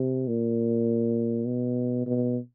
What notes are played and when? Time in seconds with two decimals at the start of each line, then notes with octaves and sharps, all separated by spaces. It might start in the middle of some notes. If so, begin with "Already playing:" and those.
Already playing: C3
0.28 A#2
1.47 B2
2.06 B2